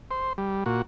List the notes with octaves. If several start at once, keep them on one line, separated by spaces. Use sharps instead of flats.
C5
G3
A#2 F#4